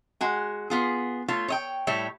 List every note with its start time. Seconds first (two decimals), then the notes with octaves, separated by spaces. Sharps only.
0.21 G#3 F#4 G#5
0.70 B3 F4 G#4
1.28 A3 F4 C#5
1.48 C#5 D#5 G5
1.87 A2 G3 C#5 E5